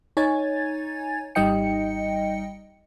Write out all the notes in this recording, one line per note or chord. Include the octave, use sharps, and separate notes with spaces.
D#4 C#5 G#5 G#6 A6
G#1 G3 D#4 D#5 G5 C#7